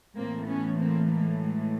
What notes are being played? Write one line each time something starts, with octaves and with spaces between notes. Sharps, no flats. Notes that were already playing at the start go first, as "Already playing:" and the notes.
A2 E3 A#3 C4
B3 C#4
A#3 C4
G#3 A#3
F#3 G#3